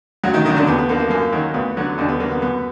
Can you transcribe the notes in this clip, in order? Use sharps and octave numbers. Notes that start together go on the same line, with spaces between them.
D2 F#3 F#4
D#3 D#4
D3 D#3 D#4
F#3
D3 D4
D#2 B3
B3
D3 F3 A#3
A#3
F#2 A#3
D#3 F#3
D2 B3
D3 F#3
D#2 D3 D4
B3
D3 F#3 A#3
B3
F#2 B3